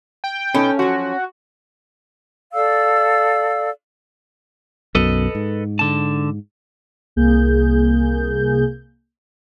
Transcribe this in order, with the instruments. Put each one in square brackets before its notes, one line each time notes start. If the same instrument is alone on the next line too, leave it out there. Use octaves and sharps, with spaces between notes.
[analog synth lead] G5
[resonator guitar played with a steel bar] B2 D#4 A4 [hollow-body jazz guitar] C#4
[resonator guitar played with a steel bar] F3 F#3 [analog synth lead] F#4
[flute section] A4 D5 F5 E6
[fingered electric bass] B1 F#2 B2 [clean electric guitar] A4 B4 D#5
[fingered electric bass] G#2
[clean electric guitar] D3 A5
[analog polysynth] C2 A#3 G#4 G6